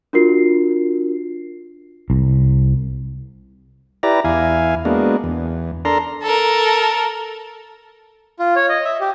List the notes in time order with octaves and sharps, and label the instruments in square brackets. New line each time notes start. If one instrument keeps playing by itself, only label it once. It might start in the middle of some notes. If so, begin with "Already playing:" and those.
[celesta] D4 F4 F#4 A#4 C7
[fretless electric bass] C2
[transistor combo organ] E4 G4 B4 D5 A#5
E2 E4 F5 G#5
G#3 A#3 B3 D4 F#4
E2
D4 A4 A#4 A#5 C6
[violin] A4 A#4
[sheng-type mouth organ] F4
C#5
D#5
E5
G4